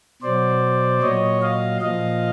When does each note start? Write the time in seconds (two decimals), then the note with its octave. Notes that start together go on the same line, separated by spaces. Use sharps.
0.22 B2 F#3 C5 D5
1.02 A#2 F#3 C#5 D#5
1.42 D#5 F5
1.81 A#2 F3 D#5 F5